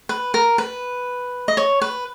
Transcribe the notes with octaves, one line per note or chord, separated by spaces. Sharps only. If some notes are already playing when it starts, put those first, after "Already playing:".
B4
A#4
B4
D#5
C#5
B4